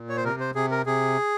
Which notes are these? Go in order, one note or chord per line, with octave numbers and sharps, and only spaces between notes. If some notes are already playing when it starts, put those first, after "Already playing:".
Already playing: A#2
C#5
C5
C3 A#4
C5
C3 G#4
A#4
C3 G#4